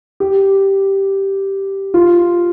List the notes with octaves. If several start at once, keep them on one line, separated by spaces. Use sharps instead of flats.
G4
F4